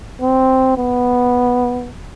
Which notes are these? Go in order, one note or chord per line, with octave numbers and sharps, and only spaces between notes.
C4
B3